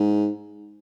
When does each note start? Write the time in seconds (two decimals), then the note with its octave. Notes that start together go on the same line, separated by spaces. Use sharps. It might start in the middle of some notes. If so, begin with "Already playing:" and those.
Already playing: G#2